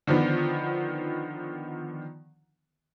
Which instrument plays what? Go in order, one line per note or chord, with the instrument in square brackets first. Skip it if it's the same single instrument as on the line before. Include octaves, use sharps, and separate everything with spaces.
[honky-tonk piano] D3 D#3 F3 B3